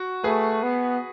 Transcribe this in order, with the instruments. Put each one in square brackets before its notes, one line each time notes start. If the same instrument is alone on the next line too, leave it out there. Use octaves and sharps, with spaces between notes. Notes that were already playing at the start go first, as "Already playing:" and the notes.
Already playing: [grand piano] F#4
[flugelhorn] A3 [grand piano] G#4 B4
[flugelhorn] B3